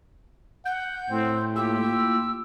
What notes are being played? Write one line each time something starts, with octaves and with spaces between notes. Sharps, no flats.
F#5 G6
A2 C4
A#3 E4 F4 G4 E6